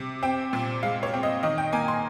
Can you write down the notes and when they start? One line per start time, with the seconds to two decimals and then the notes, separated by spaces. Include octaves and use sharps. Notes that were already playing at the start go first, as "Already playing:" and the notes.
Already playing: C3
0.23 C4 G5
0.53 A#2
0.83 G#3 F5
1.03 C#5
1.14 C4
1.23 D#5
1.43 D#3 D#5
1.58 G5
1.73 A#3 G#5
1.88 C6